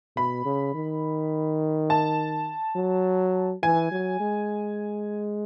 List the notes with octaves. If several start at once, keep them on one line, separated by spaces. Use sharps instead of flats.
B2 B5
C#3
D#3
A5
F#3
E3 G#5
F#3
G#3